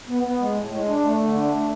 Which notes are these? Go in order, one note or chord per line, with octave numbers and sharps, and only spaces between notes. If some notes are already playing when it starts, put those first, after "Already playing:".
B3
B3
G#3
A2
G#3
D4
A3
D3
D4
A3